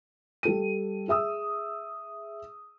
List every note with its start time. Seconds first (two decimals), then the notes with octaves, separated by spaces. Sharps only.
0.43 G3 A4 D#7
1.08 G#4 E5 D#6 E6